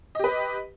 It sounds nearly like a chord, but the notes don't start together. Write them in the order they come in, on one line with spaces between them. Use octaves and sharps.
D#5 G4 B4